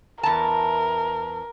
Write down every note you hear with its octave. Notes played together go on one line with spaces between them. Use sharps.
E2 A#4 A5